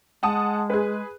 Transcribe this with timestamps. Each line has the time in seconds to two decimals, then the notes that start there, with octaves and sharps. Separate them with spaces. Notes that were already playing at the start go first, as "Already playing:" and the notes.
0.23 G#3 F#5 A5 D#6
0.70 G#4 B4